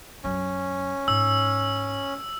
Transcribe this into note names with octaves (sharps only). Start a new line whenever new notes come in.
F#2 F#3 C#4
G#2 E6